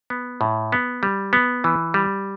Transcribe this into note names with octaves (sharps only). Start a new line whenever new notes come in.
B3
A2
B3
G3
B3
E3
G3